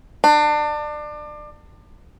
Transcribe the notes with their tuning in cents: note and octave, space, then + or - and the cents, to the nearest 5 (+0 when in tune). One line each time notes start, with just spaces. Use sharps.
D4 +30